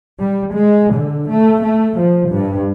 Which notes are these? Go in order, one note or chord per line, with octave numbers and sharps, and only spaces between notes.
G3
G#3
D3
A3
A3
F3
G2